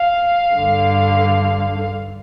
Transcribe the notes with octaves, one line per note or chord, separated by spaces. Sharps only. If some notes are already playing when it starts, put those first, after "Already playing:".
Already playing: F5
G2 D3